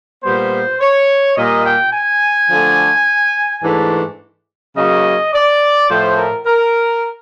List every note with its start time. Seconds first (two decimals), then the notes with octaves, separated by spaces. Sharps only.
0.24 A#2 G3 B3 C5
0.81 C#5
1.37 A#2 G3 A#3 D#5
1.66 G5
1.93 G#5
2.50 D3 F3 A3 D4
3.63 G#2 E3 A3 D4
4.76 C#3 F#3 A#3 C#4 D#5
5.33 D5
5.89 A2 F3 A3 C5
6.17 A#4
6.46 A#4